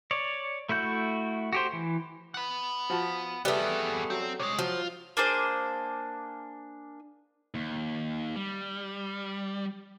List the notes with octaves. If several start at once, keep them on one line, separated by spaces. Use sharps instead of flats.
C#5 D5
A3 E4 F#4 G6
F#4 G4 C5
E3
F#5 B5
F3 F#4 A5
G3 A3 B3 G4 G#4 B4 E5
F#3 C4
C3 G#3 C#5
F3 F#3 F4
A#3 D4 G#4 C5
D#2
G3